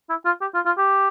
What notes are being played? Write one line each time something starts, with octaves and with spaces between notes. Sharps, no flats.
E4
F4
G4
F4
F4
G4